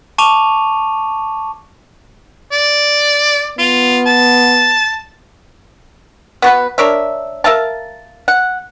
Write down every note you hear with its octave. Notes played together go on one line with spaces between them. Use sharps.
A5 C#6 D6 D#7 F7
D5
B3 F4
A5
B3 F#4 B4
D4 A#4 C#5 E5
A#4 E5 F5 A5
F#5